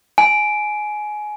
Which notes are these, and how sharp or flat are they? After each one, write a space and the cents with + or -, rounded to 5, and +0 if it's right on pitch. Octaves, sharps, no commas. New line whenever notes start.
G#5 +20